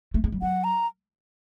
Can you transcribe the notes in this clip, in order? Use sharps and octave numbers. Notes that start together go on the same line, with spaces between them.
A3
G#3
G3
F#3 F#5
A#5